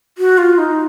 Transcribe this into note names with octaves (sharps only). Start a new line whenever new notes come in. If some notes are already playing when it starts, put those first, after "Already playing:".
F#4
F4
D#4